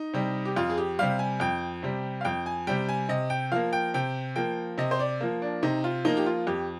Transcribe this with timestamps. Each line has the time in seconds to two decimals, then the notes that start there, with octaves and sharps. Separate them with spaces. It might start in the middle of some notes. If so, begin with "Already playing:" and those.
Already playing: D#4
0.14 C3 G3
0.45 G4
0.56 F2 F4
0.70 G#4
0.78 G4
0.99 C3 G3 F5
1.19 G#5
1.40 F2 G5
1.83 C3 G3
2.21 F5
2.25 F2 G5
2.46 G#5
2.67 C3 G3 G5
2.89 G#5
3.09 C3 D#5
3.30 G5
3.52 F3 A#3 F5
3.73 G5
3.94 C3 G5
4.36 F3 A#3 G5
4.78 C3 D#5
4.91 C5
4.99 D5
5.20 F3 A#3
5.42 D4
5.63 C3 D#4
5.84 F4
6.05 F3 A#3 D#4
6.17 G4
6.26 F4
6.47 F2 G4